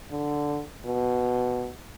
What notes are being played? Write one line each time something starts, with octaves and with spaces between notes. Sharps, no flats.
D3
B2